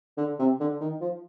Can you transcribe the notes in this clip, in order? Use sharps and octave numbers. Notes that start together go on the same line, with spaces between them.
D3
C3
D3
D#3
F3